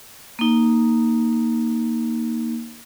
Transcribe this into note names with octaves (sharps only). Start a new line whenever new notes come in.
A#3 D#4